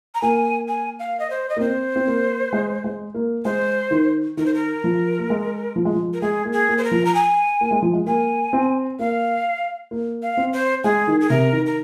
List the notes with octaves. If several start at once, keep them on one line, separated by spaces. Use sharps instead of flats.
A#5
A#3 G#5
G#5
F5
D#5
C5
D#5
A#3
C4 C5
C4
A#3
G#3
G#3
A#3
G#3 C5
D#3
D#3 A#4
C5
A#4
F3
A#3
G#3
F3
G#3
F3
A#4
G#3 G#4
A#3
G#4
A#3
C5
A#4
F3
A#5
G#5
A#3
G#3
F3
G#3
A#3 G#5
C4
A#3 F5
A#3
F5
C4
C5
G#3 G#4
D#3
G#4
C3 A#4
D#3
A#4